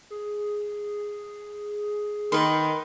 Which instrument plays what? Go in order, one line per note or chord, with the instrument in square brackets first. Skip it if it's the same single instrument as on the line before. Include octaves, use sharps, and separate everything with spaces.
[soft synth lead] G#4
[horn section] D#3 [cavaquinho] B4 C6